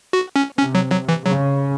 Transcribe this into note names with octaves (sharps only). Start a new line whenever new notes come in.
F#4
C#4
C3 C#4
F#3
F#3
E3
C#3 F#3